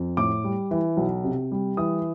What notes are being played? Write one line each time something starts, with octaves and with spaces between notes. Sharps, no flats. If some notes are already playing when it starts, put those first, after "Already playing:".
Already playing: F2
A2 D6
G3
E3
B1
C3
G3
E3 D#6